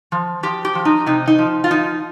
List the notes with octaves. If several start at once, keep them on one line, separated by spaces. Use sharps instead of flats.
F3
F3 G4
G4
F3
D#4
C3 D#4
D#4
F3
F4
F3 D#4